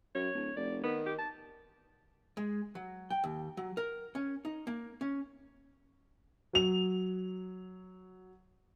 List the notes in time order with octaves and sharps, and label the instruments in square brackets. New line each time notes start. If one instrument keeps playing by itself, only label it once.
[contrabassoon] F#2 [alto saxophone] C#5
[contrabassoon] D1
[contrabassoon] F1 [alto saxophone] D5
[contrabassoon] D#3 [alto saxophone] B3
[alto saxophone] G4
A5
[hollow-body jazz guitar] G#3
F#3
G5
D#2
F#3
A#4
C#4
D#4
A#3
C#4
[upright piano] F#3 F7